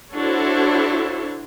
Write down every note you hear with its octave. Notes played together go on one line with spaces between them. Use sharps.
D4 E4 F#4 A4 C5 C#5